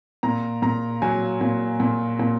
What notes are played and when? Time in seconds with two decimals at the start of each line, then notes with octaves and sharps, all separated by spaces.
0.23 A#2 A#5
0.62 A#2 A#5
1.02 F#3 G#5
1.41 A#2
1.80 A#2
2.20 A#2